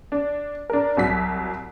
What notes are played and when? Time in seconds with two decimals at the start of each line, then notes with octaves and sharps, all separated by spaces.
0.12 D4
0.70 D4 A#4
0.97 C2 F#3 B6